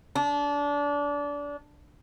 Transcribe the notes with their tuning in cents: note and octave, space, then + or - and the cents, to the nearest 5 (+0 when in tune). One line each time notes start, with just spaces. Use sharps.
D4 -25